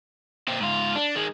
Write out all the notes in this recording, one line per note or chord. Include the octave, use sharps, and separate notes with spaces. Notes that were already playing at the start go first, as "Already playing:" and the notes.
A#2 C4
G#2 F4
D4
D#3 G#3